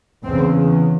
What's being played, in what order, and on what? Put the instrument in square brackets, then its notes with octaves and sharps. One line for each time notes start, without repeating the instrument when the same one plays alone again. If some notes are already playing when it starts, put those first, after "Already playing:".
[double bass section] E2 C#3 C4